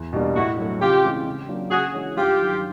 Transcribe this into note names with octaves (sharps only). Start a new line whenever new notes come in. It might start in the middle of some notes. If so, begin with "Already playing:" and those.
Already playing: E2
B2 G3 A#3 D4
A2 E4 F#4
F#3 A3
C#3 F4 G4
E3 G#3 C4
C#3
F#3 A#3 D4 F4
C#3 F#4 G#4
E3 G#3 C#4 E4
G2 F4 G4
D#3 F#3